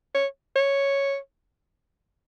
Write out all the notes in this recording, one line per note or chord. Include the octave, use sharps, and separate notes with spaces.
C#5
C#5